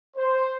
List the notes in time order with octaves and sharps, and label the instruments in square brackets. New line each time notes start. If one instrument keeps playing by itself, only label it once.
[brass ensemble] C5